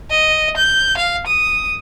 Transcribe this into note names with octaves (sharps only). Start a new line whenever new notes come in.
D#5
G6
F5
D#6